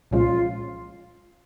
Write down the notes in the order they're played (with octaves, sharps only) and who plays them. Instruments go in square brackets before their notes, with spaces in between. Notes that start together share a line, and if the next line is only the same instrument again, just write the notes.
[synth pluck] C2 A#2 F3 G#3 C#4 [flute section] F4